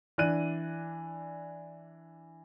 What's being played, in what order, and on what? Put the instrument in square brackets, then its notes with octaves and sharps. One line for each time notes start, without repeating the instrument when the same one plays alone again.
[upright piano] E3 D4 D5 F#6 D#7